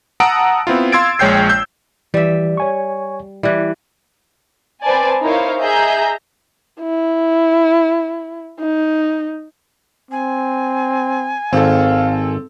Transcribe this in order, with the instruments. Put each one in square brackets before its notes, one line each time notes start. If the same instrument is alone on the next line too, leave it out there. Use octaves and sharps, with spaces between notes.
[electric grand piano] F#5 A5 A#5 D#6 E6 D7
B3 C4 E4 F4
F5 C6 E6 G#6 A6 D7
A#1 G#3 C#5 G5 G6 C7
E6 G6
[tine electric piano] E3 [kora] G3 E5
[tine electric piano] C#5 G#5 C#6
[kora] E3 G3 [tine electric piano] E4 F#6
[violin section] C4 B4 C5 D5 G#5 A5
D#4 E4 A#4 C5 C#5 F5
G#4 D#5 E5 A#5 G6
[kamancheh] E4
D#4
[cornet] C4 [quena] G#5
[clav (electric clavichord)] G#1 [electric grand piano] C4 A4 [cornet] F5